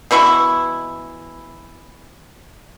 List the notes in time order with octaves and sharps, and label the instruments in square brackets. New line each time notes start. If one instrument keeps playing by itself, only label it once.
[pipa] B2 E3 E4 C#6